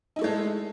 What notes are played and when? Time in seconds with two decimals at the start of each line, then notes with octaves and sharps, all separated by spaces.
0.16 D#4
0.19 E4
0.21 A3
0.24 G#3
0.27 A4